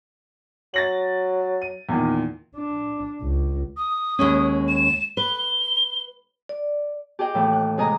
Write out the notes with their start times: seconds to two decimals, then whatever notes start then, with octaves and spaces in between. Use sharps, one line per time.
0.74 F#3 A6 A#6 F#7
1.62 D#7
1.89 E2 A#2 D#3
2.56 D4
3.22 C#2
3.77 D#6
4.19 D#2 G#3 C#4
4.68 E7
5.17 B4 G7
6.49 D5
7.19 G4 G#4 D#5 G5
7.35 D#2 A2 E3
7.53 F#6
7.78 C3 G#3 D#5 G#5 A#5